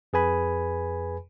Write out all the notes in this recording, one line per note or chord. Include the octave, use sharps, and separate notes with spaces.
F2 G#4 B4 G#5 B5